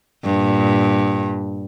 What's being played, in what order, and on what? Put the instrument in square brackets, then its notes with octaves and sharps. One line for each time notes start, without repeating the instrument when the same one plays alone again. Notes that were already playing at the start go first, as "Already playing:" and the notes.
[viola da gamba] G2 A#2